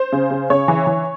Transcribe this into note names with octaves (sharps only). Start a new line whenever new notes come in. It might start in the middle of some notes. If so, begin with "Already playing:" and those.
Already playing: C5
C#3
C#3
C#3 C#5
E3
E3